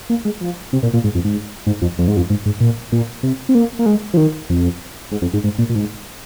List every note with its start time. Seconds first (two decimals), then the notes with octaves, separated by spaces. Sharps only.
0.10 A#3
0.25 G#3
0.41 F3
0.73 C3
0.83 A#2
0.94 A#2
1.04 G#2
1.15 F2
1.25 G#2
1.67 G#2
1.82 F2
1.99 F2
2.08 G#2
2.17 F2
2.30 G#2
2.46 G#2
2.60 A#2
2.92 A#2
3.23 C3
3.49 C4
3.55 A#3
3.79 A#3
3.86 G#3
4.14 F3
4.17 D#3
4.50 F2
5.12 G#2
5.22 F2
5.33 G#2
5.44 G#2
5.58 A#2
5.70 A#2
5.75 G#2